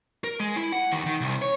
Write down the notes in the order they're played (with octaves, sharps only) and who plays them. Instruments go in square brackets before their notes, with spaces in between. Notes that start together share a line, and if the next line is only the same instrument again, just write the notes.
[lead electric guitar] A#4
G#3
E4
F#5
D#2
D#3
C2
C#5